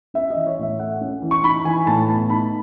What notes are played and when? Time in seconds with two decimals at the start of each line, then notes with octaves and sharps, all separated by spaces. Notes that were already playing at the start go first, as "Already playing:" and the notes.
0.14 C#4 E5
0.30 D#5
0.35 E3
0.47 C#5
0.58 A2 E5
0.78 A3 F#5
1.01 C#4
1.22 E3
1.31 C#6
1.43 D#4 B5
1.65 E3 G#5
1.86 A2 A5
2.09 B3 A5
2.29 D#4 B5